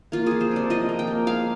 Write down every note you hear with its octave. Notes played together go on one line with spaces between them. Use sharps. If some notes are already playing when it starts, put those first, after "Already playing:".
A#3 F4
F3 G#4
C5
C3 D5
F3 D#5
A#3
G5
A#3
G#3 F5